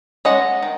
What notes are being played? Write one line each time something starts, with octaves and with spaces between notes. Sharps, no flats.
G#3 C#4 D#5 F#5
D#3